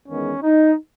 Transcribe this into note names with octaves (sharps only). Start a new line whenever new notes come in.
E2 D#3 G#3 B3 C#4
D#4